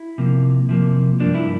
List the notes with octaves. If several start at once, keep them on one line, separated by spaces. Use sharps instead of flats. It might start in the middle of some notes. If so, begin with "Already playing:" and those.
Already playing: E4
C3 F3 A#3
C3 F3 A#3
G2 F3 A#3 D4
E4